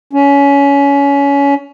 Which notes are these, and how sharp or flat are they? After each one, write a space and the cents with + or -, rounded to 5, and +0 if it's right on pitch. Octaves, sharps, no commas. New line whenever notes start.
C#4 +25